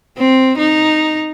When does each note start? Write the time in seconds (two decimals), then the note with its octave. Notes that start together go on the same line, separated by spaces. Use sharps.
0.18 C4
0.59 D#4